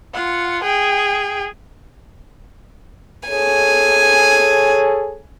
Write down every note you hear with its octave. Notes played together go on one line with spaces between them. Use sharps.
F4 F#5
G#4 G5
G#4 A4 C#5 G#5